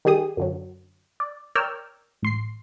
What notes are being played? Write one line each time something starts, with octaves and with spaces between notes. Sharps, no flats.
D#3 G3 G4 G#4 D#6
F#2 D3 F#3
D5
A#4 C#5 D5 G5 E6 F6
A1 C6 C7